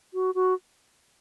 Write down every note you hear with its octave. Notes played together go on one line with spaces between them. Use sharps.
F#4
F#4